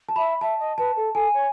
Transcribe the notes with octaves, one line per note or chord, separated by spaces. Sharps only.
A5
E5 B5
E5 A5
D#5
B4 A5
A4
A4 G#5
C#5